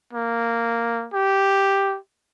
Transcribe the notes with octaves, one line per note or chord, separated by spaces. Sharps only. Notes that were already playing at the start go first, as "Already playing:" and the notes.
A#3
G4